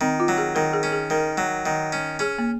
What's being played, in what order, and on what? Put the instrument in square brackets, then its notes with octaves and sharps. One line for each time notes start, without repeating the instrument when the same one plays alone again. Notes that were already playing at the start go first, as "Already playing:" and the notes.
[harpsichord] D#3 [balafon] C4
[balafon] F4
[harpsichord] F#3
[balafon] G#4
[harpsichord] D#3 [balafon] A#4
[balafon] G#4
[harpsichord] C#4
[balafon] G#4
[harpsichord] D#3 [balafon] A#4
[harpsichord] F#3
D#3
C#4
[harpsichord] C#4 [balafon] G#4
[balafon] A#3